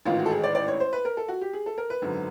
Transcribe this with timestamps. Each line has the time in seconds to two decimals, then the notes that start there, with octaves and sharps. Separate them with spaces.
0.05 A1 G#2 D#3 F4
0.19 F#4
0.26 A4
0.31 G#4
0.44 D5
0.55 D5
0.68 C#5
0.80 C5
0.93 B4
1.05 A#4
1.17 A4
1.28 F#4
1.41 G4
1.53 G#4
1.66 A4
1.78 A#4
1.90 B4
2.02 G#1 F#2 D3